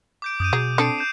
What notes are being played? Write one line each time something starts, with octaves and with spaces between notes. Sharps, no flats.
D6 G6 D7
F#2 D#6 G6 D#7
B2 F#3 G#4
C4 D4 A4 D#6 C7 D7
G6 E7